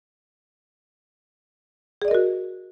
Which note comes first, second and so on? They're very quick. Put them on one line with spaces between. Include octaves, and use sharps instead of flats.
G#4 D5 D#5 A#4 F#4